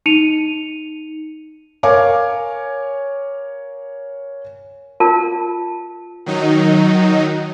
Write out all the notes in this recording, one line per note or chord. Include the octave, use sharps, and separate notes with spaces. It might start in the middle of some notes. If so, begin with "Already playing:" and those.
D#4 C#7 D#7 F7
A#4 C#5 F5 G#5 D6
F4 A#4 A5
D#3 F#3 D#4